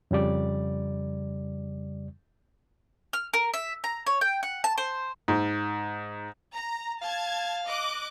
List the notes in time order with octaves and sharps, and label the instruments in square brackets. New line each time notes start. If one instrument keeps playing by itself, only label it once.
[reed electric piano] F2 C#3 G3 D5
[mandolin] F6
A#4
E5
A#5
C#5
G5
F#5
A5
C5
[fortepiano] G#2
[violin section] A#5
[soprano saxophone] F5 [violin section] A5 G#6
[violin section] D#5 D6 F#6